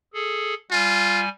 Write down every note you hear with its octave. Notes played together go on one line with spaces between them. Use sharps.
G#4 A4
G3 F4 G#5